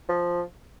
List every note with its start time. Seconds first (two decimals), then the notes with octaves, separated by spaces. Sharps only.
0.09 F3